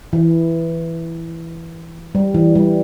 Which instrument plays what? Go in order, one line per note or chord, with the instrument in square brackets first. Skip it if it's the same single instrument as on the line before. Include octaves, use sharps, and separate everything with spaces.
[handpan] E3
G3
E3
G3